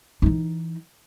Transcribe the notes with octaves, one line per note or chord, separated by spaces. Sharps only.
E3 D#4